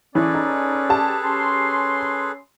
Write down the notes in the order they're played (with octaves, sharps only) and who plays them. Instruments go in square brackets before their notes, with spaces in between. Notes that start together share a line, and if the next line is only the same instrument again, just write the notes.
[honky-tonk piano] E3 [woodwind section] C#4 D5 [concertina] G#4 A4 B4
[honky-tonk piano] D#4
G4 A5
[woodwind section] C#4 C6